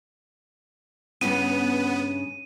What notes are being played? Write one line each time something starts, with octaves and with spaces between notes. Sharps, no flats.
G2 C#3 B3 C#4 D#7